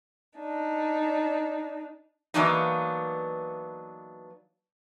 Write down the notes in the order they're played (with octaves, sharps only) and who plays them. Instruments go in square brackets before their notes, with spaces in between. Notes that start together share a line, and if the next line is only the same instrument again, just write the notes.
[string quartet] D4 D#4
[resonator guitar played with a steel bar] E3 F#3 A#3 B3 D4 D#4